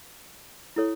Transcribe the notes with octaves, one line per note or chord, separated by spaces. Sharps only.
E4 A4 C#5